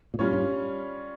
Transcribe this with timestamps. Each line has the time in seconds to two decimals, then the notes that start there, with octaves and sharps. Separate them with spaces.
0.14 A#2
0.19 A2 G3 C#4 F4 C#5
0.33 G2